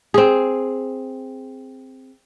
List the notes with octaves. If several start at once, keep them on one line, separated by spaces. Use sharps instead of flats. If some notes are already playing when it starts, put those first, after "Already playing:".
C4 G#4